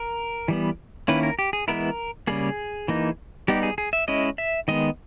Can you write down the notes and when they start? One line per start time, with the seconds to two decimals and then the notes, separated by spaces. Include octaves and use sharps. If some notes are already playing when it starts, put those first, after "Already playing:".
Already playing: A#4
0.48 E3 G3 B3
1.08 D#3 A#3 C#4 E4 B4
1.23 A#4
1.39 G4
1.53 G#4
1.68 E3 G#3 B3 E4 A#4
2.27 C#3 G3 A#3 G#4
2.88 E3 A#3 D#4
3.48 G3 B3 D#4 G4
3.63 G#4
3.78 G#4
3.93 E5
4.08 G#3 C#4 E4 D#5
4.38 E5
4.68 D#3 G#3 B3 D#5